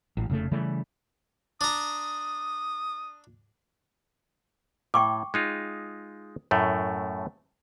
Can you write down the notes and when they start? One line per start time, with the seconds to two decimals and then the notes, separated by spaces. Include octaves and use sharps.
0.17 A1
0.29 F1 C#3 A3
0.51 C#3 E3 G3 A3
1.61 D4 A#5 D#6
4.94 A2 G5 C#6 D6
5.34 G#3 D#4 F4
6.51 F#2 A2 A3